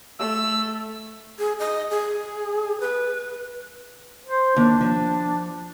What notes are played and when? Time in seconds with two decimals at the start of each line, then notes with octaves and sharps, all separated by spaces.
0.19 A3 E6
1.39 G#4
1.59 D#5
1.91 G#4
2.80 B4
4.26 C5
4.56 D#2 D4
4.81 F3